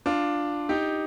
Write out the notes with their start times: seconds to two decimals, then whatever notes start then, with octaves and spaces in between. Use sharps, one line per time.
0.06 D4 F4
0.69 D#4 G4